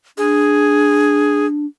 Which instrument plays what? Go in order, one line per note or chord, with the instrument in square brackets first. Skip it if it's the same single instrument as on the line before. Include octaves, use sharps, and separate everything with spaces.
[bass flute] D4 [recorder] G#4